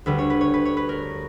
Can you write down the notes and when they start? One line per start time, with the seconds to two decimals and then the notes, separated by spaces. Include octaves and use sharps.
0.06 D2 D3 G3 B4
0.18 C#5
0.30 B4
0.41 C#5
0.54 B4
0.65 C#5
0.77 B4
0.89 A#4